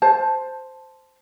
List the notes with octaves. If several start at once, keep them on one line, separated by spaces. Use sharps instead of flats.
C5 A5